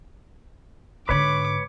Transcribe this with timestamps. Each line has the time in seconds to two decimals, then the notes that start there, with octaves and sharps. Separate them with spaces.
1.09 G#2 D3 B4 C#5 B5 D6